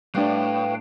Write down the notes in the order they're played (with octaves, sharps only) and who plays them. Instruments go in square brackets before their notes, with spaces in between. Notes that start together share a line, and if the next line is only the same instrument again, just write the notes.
[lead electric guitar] A2 [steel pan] G3 D4 [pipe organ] B4 F5 G5